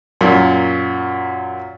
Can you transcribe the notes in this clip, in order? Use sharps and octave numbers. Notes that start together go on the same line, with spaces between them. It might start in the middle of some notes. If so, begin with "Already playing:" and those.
F#2 A#2